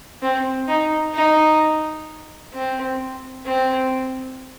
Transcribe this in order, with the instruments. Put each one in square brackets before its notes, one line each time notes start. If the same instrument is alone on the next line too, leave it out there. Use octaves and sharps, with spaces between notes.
[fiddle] C4
D#4
D#4
C4
C4